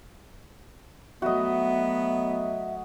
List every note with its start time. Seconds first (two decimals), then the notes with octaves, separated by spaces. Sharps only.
1.22 F#3 A3 B3 F#4 D#5 E5